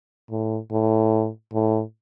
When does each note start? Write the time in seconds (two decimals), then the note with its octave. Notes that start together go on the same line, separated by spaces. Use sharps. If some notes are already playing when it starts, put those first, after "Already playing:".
0.31 A2
0.72 A2
1.53 A2